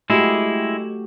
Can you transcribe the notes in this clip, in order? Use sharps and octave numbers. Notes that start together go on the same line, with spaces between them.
G#3 A3 E4 F#4 G4